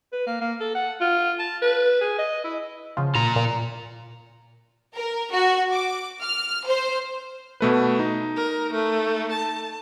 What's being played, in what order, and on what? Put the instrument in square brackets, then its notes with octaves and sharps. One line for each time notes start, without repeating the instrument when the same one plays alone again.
[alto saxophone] B4
A#3
A#3
A4
F#5
F4
A5
B4
G#4
D#5
E4
[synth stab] C#3 F3
[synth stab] A#2 [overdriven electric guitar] F4 A#5
[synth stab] A#2
[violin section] A#4
F#4
D6
F6
C5
[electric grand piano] B2 A3 B4
D#4
[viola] A#4
A3
A5